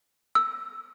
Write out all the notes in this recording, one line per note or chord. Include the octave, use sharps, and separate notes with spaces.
E6